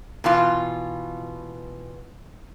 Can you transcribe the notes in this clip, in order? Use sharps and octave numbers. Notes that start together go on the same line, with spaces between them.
B2 E3 F4